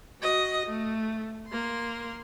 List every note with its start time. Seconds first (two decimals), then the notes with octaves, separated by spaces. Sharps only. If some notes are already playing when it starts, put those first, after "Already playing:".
0.21 F#4 D#5
0.67 A3
1.48 A#3 C6